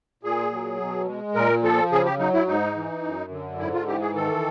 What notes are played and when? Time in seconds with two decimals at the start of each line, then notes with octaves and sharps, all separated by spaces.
0.23 A#2 G#4
0.52 F#3
0.80 B2
1.08 G#3
1.35 A#2 A#4
1.63 F3 A4
1.92 C#3 G#4
2.05 G4
2.19 F#3 D#4
2.33 E4
2.47 G#2 D#4
2.76 E3
3.04 F#2
3.31 D3
3.59 G#2 E4
3.74 F4
3.87 E3 G4
4.01 G#4
4.15 D#3 A4